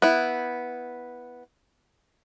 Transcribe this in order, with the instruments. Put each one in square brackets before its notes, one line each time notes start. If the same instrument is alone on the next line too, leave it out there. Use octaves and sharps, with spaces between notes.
[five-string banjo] B3 E4